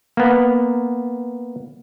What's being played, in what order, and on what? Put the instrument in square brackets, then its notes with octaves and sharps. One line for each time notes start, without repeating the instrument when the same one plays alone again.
[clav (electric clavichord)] A#3 B3